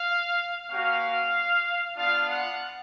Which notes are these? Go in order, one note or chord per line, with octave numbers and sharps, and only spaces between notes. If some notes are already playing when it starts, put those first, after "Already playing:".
Already playing: F5
A#3 C#4 F#4 F5
B3 D4 F4 F5
F#5